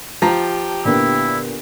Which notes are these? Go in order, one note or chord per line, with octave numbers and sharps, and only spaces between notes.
F3 G4 A5 A#5
A#2 D3 B3 E4